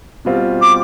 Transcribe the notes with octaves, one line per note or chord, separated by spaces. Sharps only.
B2 G3 C4 F4
D6